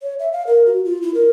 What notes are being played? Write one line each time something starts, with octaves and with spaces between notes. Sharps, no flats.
C#5
E5
F5
A#4
F#4
F4
E4
A#4